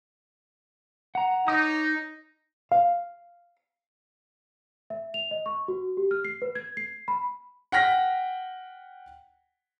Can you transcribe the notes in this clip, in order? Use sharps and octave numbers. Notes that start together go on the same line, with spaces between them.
F#5 A#5
D#4 C#5 D6 D#6
F5
E5
F7
D#5
C#6
F#4
G4
F6
C7
B4
G#6
C7
B5
F#5 G5 F6 A#6 B6